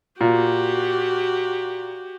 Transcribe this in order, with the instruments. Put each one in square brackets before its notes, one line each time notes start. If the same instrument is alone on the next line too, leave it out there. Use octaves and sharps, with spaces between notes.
[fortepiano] A#2 [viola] F#4 G4